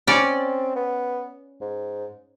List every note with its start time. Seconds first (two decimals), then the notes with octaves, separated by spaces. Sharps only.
0.07 C4 C#4 D5
0.75 B3
1.61 G#2